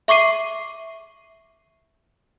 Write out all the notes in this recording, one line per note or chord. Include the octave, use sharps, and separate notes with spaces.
E5 C#6 D6 C7 D#7